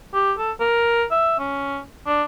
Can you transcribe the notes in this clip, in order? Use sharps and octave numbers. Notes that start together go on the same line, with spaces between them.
G4
A4
A#4
E5
C#4
D4